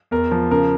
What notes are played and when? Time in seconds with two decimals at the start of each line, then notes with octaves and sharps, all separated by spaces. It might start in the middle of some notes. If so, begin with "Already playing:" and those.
0.11 E2 A#4
0.31 F3
0.51 C#3 A#4